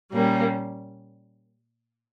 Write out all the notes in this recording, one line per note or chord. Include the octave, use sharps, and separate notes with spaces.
A#2 G3 A#3 C#4